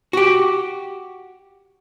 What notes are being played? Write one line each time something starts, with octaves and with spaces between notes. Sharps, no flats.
F#4 G4